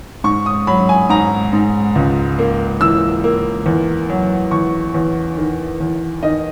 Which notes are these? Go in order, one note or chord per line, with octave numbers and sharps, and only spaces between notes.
G#2 C#6
D#6
F#3 B5
G#5
G#2 A#5
G#2
C#2
A#3
E3 E6
A#3
E2
F#3
E2 C#6
E2
D#3
E2
D#3 D#5